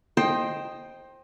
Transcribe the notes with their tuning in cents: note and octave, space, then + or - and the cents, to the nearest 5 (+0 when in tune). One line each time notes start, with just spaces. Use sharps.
C5 +20 D#5 +0 G5 +0